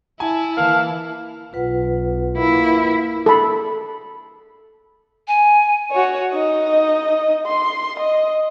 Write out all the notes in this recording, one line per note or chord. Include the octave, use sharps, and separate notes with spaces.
E4 G#5 A5
E3 A#3 F5
B1 F4 B4 F#5
A#3 E4
A4 B5
G#5
F#4 C#5
D#4 D#5
C6
D#5